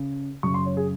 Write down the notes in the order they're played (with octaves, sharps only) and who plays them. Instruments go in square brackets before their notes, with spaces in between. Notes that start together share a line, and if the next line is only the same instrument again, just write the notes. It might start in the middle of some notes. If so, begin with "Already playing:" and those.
Already playing: [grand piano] C#3
F#2 C#3 C#6
C6
C#5
G#4